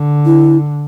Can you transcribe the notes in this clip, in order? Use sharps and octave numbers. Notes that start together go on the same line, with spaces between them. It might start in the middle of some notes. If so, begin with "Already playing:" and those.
Already playing: D3
E4